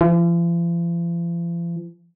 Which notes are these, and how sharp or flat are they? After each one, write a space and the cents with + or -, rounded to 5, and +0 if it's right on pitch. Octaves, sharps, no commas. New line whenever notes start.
F3 -45